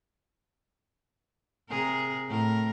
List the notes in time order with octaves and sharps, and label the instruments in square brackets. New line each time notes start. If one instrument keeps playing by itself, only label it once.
[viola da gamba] C3 G#4 A#4
A2 A#4